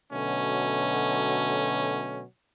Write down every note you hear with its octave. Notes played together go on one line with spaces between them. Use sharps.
B2 D3 F#3 A3 C#4